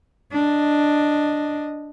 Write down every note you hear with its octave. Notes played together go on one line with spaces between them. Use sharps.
D4 D#5